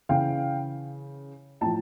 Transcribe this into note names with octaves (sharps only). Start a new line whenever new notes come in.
C#3 E3 F5 G5
A2 F3 G5 A5